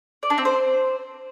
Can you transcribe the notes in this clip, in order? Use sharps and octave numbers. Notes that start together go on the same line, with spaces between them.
D5
D4
C4
C5